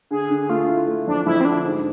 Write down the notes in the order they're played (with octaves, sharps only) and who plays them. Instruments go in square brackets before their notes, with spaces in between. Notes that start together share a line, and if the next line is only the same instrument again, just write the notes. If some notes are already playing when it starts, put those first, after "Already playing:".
[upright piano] D3 [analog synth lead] G#4
[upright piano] D3
[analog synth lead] G#4
[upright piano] A3 [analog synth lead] F4
[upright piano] E4
A3
[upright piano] F2 [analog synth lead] D4
[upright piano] F2 [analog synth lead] E4
[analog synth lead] C4
[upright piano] D3 [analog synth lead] D4
[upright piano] G#2